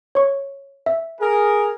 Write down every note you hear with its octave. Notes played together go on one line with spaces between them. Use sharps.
C#5 C#6
E5
G#4 A#4